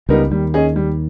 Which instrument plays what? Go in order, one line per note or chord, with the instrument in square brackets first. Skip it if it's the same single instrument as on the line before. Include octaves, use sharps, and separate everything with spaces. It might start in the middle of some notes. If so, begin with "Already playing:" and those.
[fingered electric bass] C#2 C#3 [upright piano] G3 B3 D#4 A#4
[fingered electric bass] D#2 D#3 [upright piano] G3
[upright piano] C#4 G#4 D#5
G3